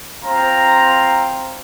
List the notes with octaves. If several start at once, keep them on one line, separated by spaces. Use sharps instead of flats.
C4 F4 A#5